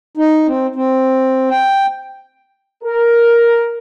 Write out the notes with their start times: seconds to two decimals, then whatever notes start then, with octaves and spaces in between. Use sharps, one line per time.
0.17 D#4
0.47 C4
0.76 C4
1.50 G5
2.84 A#4